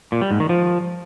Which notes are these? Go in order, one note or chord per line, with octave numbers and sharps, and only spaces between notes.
A#2
G3
G#2
D#3
F3